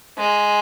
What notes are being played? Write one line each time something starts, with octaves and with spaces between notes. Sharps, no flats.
G#3